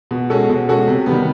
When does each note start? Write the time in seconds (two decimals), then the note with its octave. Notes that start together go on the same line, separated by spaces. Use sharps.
0.11 B2
0.30 G#3 C#4 F#4 A4
0.49 B2
0.69 G#3 C#4 F#4 A4
0.88 C3
1.06 D#3 G3 B3